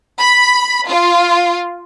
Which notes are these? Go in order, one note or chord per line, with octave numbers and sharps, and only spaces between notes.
B5
F4